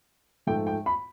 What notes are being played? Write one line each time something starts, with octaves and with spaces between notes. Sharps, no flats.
G#2 F3 A3 G5
G5
B5